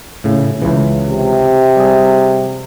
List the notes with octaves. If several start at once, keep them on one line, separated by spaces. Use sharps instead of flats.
A2 C#3
C#2 C#3 E3
C3
G3 G#4